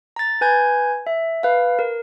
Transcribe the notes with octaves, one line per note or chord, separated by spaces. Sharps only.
A#5 A6
B4 G#5 G6 G#6
E5
B4 F5
A#4